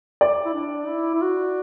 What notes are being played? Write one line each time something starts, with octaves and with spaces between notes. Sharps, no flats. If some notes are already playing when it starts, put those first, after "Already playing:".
D5
E4
D4
E4
E4
F#4